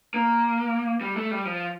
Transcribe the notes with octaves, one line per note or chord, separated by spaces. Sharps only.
A#3
G3
A3
G3
F3